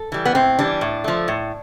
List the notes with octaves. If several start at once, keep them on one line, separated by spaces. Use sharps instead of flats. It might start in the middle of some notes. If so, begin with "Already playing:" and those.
Already playing: A4
E3 G3
B3
A2 C4
E3 G3 D4
A2
F3 A3
A2